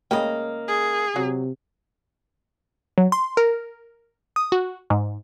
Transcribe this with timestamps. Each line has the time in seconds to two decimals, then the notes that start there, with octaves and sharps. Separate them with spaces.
0.11 C#3 G#3 A#3 D#5 G5
0.68 G#4
1.16 C3 F#3
2.98 F#3
3.12 C6
3.37 A#4
4.36 D#6
4.52 F#4
4.90 G#2